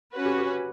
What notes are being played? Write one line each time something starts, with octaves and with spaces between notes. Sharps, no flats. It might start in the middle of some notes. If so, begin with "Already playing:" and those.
C#4 F#4 B4
G4
G4